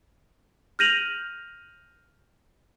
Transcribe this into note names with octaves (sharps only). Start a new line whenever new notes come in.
F6 G6 A#6 D#7 F7 F#7